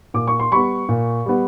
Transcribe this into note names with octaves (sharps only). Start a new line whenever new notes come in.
A#2 D6
C#6
C6
G3 B3 B5 C#6
A#2
G3 B3